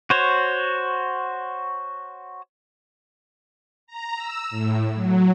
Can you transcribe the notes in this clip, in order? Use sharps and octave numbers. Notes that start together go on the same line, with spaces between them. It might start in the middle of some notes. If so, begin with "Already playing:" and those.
F#4 C5 C#5
A#5
E6
A2
F#3